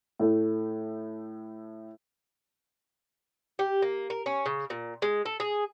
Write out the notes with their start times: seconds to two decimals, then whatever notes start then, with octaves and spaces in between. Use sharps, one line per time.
0.20 A2 A3
3.59 G4
3.82 A#3
4.10 A#4
4.26 C#4
4.46 C#3
4.70 A#2
5.02 G#3
5.25 A4
5.40 G#4